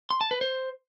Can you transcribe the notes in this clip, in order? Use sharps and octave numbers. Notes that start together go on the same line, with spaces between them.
C6
A5
B4
C5